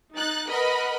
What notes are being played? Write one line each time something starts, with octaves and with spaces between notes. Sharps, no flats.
D#4 F#6 A6
A#4 B4 D#5 F#5 B5